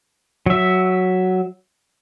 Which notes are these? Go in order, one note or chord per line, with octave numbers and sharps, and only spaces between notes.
F#3 E5